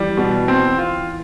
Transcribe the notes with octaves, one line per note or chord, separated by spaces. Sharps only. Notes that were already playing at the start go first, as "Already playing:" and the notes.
Already playing: E3 G3
B2
C4
F4